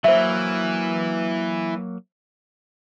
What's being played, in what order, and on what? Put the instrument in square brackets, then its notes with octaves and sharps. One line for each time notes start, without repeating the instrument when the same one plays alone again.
[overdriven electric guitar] E3 [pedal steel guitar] F#3 A#3 [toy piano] C5 E5